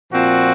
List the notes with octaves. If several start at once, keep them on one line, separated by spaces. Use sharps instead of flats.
A#2 F3 C4 F#4